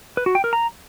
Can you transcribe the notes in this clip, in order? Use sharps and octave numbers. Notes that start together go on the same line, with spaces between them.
B4
F#4
G5
A#4
A#5